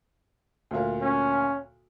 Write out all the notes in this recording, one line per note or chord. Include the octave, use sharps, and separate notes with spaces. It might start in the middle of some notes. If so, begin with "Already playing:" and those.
D2 A#2 A#3
C#4